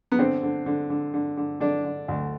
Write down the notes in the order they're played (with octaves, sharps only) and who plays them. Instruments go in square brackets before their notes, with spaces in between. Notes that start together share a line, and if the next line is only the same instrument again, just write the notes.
[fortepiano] B3
D3 C4
D3
D3
D3
D3
D3
D3 D4
D3
D2